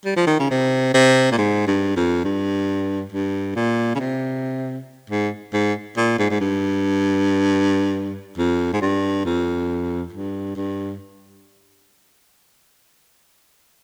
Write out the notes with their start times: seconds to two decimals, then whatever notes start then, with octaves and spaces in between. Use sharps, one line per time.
0.05 G3
0.16 F3
0.27 D#3
0.39 C#3
0.51 C3
0.94 C3
1.31 A#2
1.38 G#2
1.67 G2
1.96 F2
2.24 G2
3.12 G2
3.56 A#2
3.95 C#3
4.00 C3
5.10 G#2
5.54 G#2
5.97 A#2
6.19 G#2
6.30 G#2
6.41 G2
8.38 F2
8.73 G#2
8.82 G2
9.25 F2
10.13 G2
10.56 G2